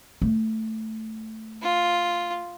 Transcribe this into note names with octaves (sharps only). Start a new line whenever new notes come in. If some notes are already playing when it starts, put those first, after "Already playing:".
A3
F4